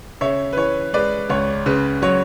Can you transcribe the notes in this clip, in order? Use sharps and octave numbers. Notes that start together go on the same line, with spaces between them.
C#3 C#5 E5
B4
E3 C#5
G#3 B4 D5
C#2 C#5
C#3 B4
F#3 C#5